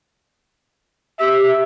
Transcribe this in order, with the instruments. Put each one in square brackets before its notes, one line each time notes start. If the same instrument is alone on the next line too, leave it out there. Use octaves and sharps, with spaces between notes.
[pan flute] G4 [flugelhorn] E5